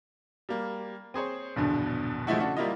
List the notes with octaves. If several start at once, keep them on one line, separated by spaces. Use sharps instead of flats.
G3 A#3
C4 G#4 C5 C#5
A#1 E2 G2 B2 D3
F3 G#3 A3 E4 F#4
C#3 D4 F#4 A4
G3 A#3 E4 F4 D#5